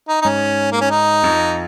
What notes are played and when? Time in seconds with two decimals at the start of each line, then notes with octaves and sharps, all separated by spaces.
0.08 D#4
0.22 D#4
0.25 G#2 C#4
0.72 A#3
0.81 C#4
0.90 D#4
1.23 F2